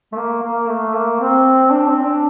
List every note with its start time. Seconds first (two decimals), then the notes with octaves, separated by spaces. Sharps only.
0.12 A3
0.17 A#3
0.43 A#3
0.69 A3
0.94 A#3
1.20 C4
1.71 D4
1.88 C4
2.04 D4